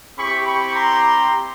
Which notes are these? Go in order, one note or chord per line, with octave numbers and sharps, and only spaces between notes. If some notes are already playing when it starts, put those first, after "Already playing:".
C4 E4 G4 B5 C#6
B5 C#6
A#5 C6